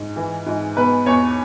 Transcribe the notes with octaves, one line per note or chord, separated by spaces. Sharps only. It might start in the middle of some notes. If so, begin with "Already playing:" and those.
Already playing: G#2
E3
G#2
B2 B4
E2 C#5